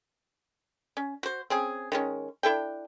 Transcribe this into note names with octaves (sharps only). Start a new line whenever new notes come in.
C#4
F#4 C5
C4 C#4 G#4
D#3 G#3 C#4
D4 E4 A4 G5